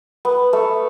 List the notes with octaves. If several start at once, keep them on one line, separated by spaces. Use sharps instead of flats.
B3
A3